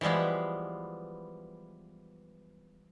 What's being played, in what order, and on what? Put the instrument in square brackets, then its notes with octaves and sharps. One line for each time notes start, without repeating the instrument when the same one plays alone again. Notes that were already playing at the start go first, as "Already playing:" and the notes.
[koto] E3 F3 G3 G#3 B3